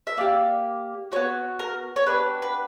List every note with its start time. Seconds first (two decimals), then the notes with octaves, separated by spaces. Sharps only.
0.07 E5
0.17 A#3 D4 G4 D5
1.12 B3 F#4 C#5
1.59 A#4
1.96 C#5
2.06 B3 D4 G4 B4
2.42 B4